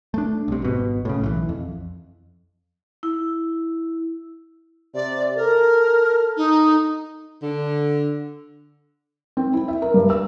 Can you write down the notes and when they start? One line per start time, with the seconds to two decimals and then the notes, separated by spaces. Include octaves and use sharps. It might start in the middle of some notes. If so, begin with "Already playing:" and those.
0.14 A3 D4
0.48 C2 C3
0.62 G#1 B2
1.05 A2 C#3
1.21 B1 D3 E3
1.49 F2
3.03 E4
4.95 C3 D5
5.37 A4 A#4
6.37 D#4
7.43 D3
9.37 C4
9.53 E4
9.68 E5
9.82 A#4
9.94 G2
10.10 E6